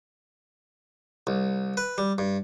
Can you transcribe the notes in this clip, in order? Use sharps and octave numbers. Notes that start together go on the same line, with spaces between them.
C2
B4
G3
G2